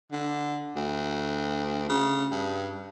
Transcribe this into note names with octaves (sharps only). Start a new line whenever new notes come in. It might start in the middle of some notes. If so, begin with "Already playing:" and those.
D3
D2
C#3
G2